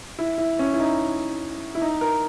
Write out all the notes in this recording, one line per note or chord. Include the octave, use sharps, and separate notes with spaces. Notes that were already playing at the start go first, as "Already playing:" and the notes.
E4
E4
C#4
E4
D#4
E4
D#4
A#4